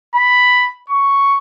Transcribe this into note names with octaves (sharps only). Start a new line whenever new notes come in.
B5
C#6